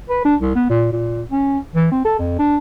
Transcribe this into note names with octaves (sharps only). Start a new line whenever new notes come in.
B4
D4
C2
B3
A#2
A#2
C#4
E3
C4
A4
F2
D4